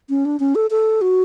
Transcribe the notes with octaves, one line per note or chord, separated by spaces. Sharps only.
C#4
D4
C#4
A4
A4
F#4